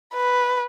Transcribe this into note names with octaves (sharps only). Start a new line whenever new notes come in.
B4